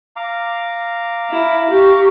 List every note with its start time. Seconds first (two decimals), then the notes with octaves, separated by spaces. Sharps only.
0.16 F5 A#5 D6
1.30 E4
1.70 G4 C#6